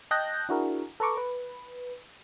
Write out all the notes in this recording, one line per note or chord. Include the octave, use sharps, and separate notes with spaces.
D#5 G5 A5 F#6 G6 A#6
D4 E4 F#4 G#4 A#4
A4 B4 A#5 C#6 D6
B4